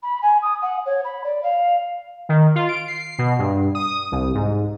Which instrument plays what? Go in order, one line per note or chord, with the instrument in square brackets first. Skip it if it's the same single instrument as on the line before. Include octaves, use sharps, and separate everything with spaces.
[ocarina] B5
G#5
D#6
F#5
C#5
B5
D5
F5
[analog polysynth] D#3
F4
D7
C7
B2
G2
D#6
C2
G#2